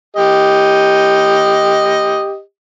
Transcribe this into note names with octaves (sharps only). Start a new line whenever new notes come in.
G4 D#5